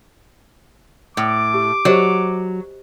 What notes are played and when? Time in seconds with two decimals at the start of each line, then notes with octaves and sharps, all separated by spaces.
1.17 A2 D6
1.54 G4
1.85 F#3 G4 C5 D#5